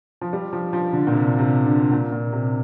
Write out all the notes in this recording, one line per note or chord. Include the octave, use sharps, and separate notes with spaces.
F3
G3
F3
F3
D3
A#2
C3
C3
D3
A#2
A#2
C3